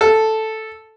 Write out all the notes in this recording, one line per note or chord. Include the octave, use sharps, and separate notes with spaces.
A4